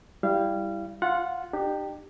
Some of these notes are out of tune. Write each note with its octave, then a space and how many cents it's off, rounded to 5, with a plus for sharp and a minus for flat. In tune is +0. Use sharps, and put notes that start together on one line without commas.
G3 +0 E4 +0 F5 -25
F4 +0 F#5 -15
D#4 -45 G4 +0